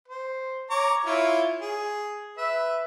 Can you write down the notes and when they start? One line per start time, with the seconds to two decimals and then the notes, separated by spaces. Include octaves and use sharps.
0.08 C5
0.70 C#5 A#5 D6
1.06 E4 F4 C#5
1.61 G#4
2.38 B4 E5